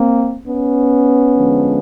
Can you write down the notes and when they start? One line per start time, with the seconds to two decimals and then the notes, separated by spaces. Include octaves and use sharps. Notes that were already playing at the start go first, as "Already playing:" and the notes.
Already playing: A#3 C4
0.46 B3 C#4
1.36 D3 F3 G#3